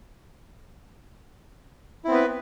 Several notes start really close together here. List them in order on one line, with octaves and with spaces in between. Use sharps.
E4 C4 B3 B4